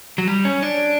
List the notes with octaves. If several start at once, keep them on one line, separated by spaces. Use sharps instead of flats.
F#3
G3
C#4
D4